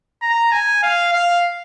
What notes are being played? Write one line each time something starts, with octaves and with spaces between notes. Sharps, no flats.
A#5
G#5
F5
F5